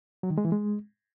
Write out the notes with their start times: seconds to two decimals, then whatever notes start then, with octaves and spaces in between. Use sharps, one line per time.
0.23 F#3
0.30 D#3
0.38 G#3
0.45 E3
0.52 G#3